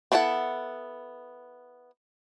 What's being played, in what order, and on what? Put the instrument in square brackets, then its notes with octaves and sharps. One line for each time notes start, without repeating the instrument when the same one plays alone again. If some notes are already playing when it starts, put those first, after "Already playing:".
[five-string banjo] B3 D4 E4 A4 F#5